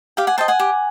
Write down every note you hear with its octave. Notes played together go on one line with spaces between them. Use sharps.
G4 F5 G5
F#5 G#5
C5 D#5 G5 A5
F#5 G#5
G4